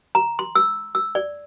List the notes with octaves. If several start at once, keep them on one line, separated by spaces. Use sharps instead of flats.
A#5
C6
E6
E6
D5